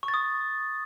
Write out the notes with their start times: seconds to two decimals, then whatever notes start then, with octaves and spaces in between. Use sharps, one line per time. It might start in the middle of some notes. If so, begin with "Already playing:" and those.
0.03 C#6
0.08 A6
0.14 D#6